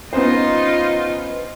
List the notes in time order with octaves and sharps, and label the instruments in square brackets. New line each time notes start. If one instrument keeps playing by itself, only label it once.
[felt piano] B3 C#4 C5 [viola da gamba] D#4 F4